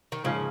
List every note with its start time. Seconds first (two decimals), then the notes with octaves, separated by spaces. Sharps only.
0.12 D#3
0.24 G#2 C#3 F3 A#3 C#4